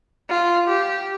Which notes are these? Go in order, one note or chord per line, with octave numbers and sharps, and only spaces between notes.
F4
G4